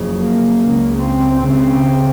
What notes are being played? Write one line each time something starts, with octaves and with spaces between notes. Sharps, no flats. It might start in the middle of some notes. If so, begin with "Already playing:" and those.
Already playing: F#1 F2 C#3
A#3
C#2 C#3
C4
C#2 C#3 C4